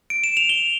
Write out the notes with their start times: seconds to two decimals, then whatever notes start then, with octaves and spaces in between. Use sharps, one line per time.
0.10 D7
0.24 E7
0.37 F7
0.49 G7